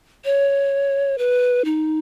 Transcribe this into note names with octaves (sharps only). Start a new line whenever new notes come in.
C#5
B4
D#4